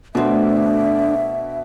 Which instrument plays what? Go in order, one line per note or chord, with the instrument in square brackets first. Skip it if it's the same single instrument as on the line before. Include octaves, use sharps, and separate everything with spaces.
[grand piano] B2 [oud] A3 C4 [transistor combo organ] D4 [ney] E5